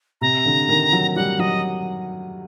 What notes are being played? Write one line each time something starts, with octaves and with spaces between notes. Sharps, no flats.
C3 A#5
D3
D#3
F#3
G3 F#5
F#3 D#5